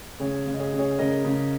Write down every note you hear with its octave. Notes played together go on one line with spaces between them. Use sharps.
C#3 G#4 C#5
C#3
D#5
G#4 C#5
C#3
G#4 C#5
C#3 A#4 D#5
C#3